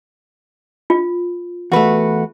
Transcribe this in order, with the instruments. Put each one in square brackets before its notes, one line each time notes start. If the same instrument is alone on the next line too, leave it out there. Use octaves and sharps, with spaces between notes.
[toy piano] F4
[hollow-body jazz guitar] E2 A3 [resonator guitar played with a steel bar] F#4 B4